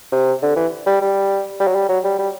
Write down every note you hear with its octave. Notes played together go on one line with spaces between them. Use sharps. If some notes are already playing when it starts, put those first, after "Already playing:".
C3
D3
E3
G3
G3
G3
F#3
G3
F#3
G3
G3